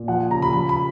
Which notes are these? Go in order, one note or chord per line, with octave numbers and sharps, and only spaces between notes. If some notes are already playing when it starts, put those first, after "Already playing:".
Already playing: A#2
F3 F#5
C#3 A#5
B5
F3 B5
B5